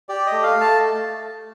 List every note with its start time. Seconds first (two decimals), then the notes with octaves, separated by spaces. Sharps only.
0.09 G4 D5
0.26 D#5
0.32 A3
0.43 F5
0.55 A3
0.61 A5